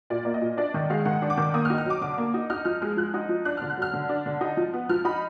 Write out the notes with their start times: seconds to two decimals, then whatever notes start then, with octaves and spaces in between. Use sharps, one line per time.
0.10 A#2 D5
0.25 A#3 D5
0.34 D#5
0.41 A#2
0.57 D4 D5
0.74 D#3 D#5
0.90 G#3 F5
1.05 D#3 F#5
1.22 D4
1.30 D6
1.38 D#3
1.54 A#3 D#6
1.65 F6
1.70 D#4
1.78 F6
1.85 F#3 D6
2.01 D3 D6
2.18 A#3
2.34 D#4
2.50 D#4 F6
2.65 F3 F6
2.82 G#3 F6
2.97 F3 F#6
3.14 D#4
3.29 F3
3.45 D4 F#6
3.57 D3 F6
3.70 F#6
3.77 F#3
3.82 F6
3.93 D3
4.09 D4
4.26 D3
4.41 D#4
4.57 F3
4.73 B3
4.89 F3 F6
5.05 D#4 B5